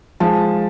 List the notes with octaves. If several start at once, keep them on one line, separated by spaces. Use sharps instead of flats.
F3 G#3 A5